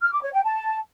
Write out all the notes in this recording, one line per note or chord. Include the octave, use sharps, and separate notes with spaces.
F6
D6
C#5
G5
A5